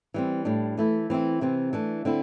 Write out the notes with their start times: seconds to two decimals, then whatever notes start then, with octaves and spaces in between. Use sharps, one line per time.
0.14 E3 G3 C4
0.45 A2 G3 D4
0.78 E3 A3 E4
1.10 E3 C4 E4
1.41 C3 E3 C4
1.73 E3 A3 D4
2.05 D3 C4 E4